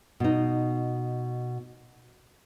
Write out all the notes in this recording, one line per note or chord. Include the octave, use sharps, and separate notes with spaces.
B2 D#4